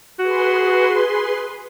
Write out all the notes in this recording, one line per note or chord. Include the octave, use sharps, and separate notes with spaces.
F#4 G#4 B4 C6